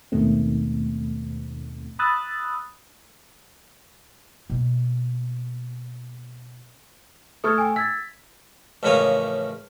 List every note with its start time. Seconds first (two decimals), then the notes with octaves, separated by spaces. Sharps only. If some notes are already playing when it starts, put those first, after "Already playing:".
0.12 D#2 G#2 B2 D#3 A3 C4
1.99 B5 D#6 E6 F#6 A6
4.50 B2 A#3
7.44 A3 A4 C#6 D#6 F6 G#6
7.58 G5 G#5
7.76 E6 G#6 A6 B6
8.83 A1 F2 C#3 A#3 C#5 D#6